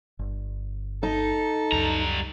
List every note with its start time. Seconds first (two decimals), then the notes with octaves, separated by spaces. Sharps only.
0.19 G1
1.03 D#4 A4
1.72 C#2 F#2 G3 A#5